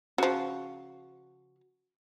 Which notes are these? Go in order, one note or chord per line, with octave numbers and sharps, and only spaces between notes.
C#3 F3 F#4